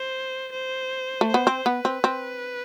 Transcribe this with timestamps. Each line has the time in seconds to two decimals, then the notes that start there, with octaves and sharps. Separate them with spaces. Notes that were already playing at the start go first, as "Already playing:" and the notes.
Already playing: C5
0.52 C5
1.21 A3
1.28 C5
1.34 B3
1.47 C4
1.66 B3 B4
1.85 C4
2.04 C4